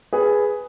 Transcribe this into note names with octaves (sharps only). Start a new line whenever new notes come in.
G#4 B4